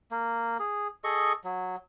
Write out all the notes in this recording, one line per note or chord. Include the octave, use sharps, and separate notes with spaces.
A#3
G#4
G#4 A4 D#5 C#6
F#3